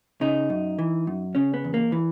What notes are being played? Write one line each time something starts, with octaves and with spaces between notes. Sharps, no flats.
C#3 D#4
F#2
E3
F#2
C#3 C#4
B3
E2
A#3
E3